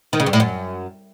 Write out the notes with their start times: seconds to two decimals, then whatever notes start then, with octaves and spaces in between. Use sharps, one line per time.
0.13 D#3
0.20 C#3
0.26 G2
0.33 A2
0.40 F#2